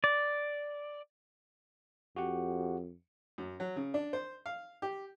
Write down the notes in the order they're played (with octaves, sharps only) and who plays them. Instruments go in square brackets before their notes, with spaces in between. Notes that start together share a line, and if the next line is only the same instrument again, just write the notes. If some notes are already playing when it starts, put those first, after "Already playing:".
[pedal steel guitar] D5
[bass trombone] F2 [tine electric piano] F#4 G4 F#5
[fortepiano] F#2
F#3
C#3
D4
C5
F5
G4